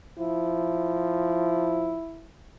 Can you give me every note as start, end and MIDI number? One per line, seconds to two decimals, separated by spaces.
0.19 2.03 53
0.19 2.28 64